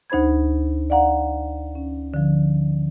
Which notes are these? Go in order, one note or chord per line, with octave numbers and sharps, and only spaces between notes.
D2 D#4 C5 B5 G#6
D5 F5 F#5 A#5
C#4
D3 F3